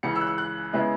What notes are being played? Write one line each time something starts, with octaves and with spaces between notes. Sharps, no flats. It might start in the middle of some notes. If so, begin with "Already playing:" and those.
C#2 C#3 E3 C#7
E6
F#6
E6
F#6
C#3 G#3 B3 E4